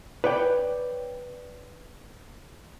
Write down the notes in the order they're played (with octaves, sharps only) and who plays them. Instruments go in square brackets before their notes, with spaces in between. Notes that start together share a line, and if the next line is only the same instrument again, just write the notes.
[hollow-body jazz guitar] B4 C#5 D5 G5